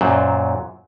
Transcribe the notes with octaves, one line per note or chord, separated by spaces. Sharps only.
F#2 A#2 F#3 C5 D5